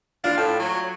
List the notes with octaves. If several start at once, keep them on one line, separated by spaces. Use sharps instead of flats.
D4 F4 F5
A2 G5 A5
F#3